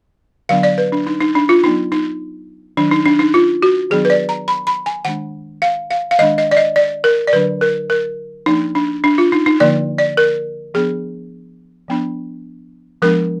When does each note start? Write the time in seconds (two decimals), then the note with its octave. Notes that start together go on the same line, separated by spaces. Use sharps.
0.49 D3 F#3 B3 D4 F5
0.63 D5
0.78 B4
0.92 D4
1.07 D#4
1.20 D#4
1.35 D4
1.49 F4
1.63 F#3 B3 D4 D#4
1.92 D#4
2.77 D#3 F#3 D4
2.91 D#4
3.06 D4
3.19 D#4
3.34 F4
3.62 F#4
3.90 D#3 F#3 B3 D4 G#4
4.05 B4
4.10 D5
4.29 A#5
4.48 B5
4.67 B5
4.86 G#5
5.05 D#3 G#3 D4 F#5
5.62 F5
5.91 F5
6.11 F5
6.19 D#3 G#3 D4 D#5
6.38 D#5
6.51 D5
6.57 D#5
6.76 D5
7.04 A#4
7.27 D5
7.33 D3 F#3 D4 B4
7.61 A#4
7.90 A#4
8.46 F3 A#3 D4 D#4
8.75 D4
9.04 D4
9.18 F4
9.32 D#4
9.46 D#4
9.60 D3 F3 A#3 D5
9.98 D5
10.17 A#4
10.74 F3 B3 D4 G#4
11.88 F3 B3 D4
13.02 F3 G#3 B3 D4 A#4